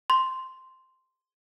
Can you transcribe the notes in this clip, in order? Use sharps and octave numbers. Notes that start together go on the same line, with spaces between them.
C6